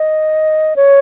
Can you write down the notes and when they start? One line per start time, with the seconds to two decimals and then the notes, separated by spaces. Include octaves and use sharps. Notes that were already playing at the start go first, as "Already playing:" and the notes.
Already playing: D#5
0.76 C#5